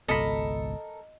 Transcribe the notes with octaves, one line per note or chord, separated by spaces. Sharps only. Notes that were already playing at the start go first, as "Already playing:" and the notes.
G#1 C#2 B2 A4 A#4 D#5 B5